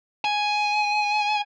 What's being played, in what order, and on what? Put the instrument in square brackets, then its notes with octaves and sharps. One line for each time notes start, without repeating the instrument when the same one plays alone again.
[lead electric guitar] G#5